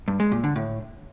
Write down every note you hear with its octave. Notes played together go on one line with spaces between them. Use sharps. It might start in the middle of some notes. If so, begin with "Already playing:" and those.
G2
G#3
A#2
D3
A2